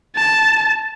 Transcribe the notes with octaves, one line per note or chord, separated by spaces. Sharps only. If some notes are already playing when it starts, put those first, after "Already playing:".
A5